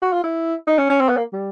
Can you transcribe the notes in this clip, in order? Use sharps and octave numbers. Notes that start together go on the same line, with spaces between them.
F#4
F4
E4
D#4
C#4
C#4
C4
B3
A#3
G3